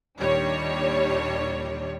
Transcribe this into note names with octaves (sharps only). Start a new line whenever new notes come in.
D#2 A#2 D#3 G3 D4 C#5